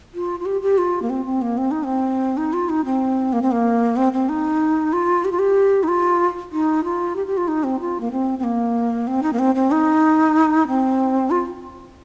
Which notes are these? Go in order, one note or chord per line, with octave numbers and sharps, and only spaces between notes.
F4
F4
G4
G4
F4
A#3
C4
C4
A#3
C4
D#4
C4
D#4
F4
D#4
C4
A#3
C4
A#3
C4
C4
D#4
F4
G4
F4
G4
D#4
F4
D#4
F4
G4
G4
F4
D#4
C4
F4
A#3
C4
C4
A#3
C4
D#4
A#3
C4
C4
D#4
C4
F4